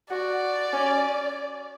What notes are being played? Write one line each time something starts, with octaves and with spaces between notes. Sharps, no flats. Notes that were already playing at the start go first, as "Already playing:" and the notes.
F#4 D5
C#4